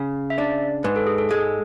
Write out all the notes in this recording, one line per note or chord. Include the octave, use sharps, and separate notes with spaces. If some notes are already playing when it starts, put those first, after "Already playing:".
Already playing: C#3
E5
D4 D5
G#2 B4
A4
G#4
A4
G#3